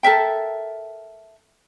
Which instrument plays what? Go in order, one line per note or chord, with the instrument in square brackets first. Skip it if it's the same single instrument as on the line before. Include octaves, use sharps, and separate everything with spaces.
[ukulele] A4 A#4 E5 G5